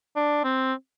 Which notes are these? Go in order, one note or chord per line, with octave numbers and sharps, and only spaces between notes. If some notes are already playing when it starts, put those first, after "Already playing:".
D4
C4